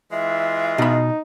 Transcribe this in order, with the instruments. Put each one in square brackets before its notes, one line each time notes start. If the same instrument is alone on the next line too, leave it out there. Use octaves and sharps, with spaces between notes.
[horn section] E3 G#3 F4 [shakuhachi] E5
[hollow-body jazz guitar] B2 B5 [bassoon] D#4